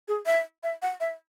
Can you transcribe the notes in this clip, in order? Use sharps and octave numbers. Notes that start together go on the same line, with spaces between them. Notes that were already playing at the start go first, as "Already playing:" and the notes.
G#4
E5
E5
F#5
E5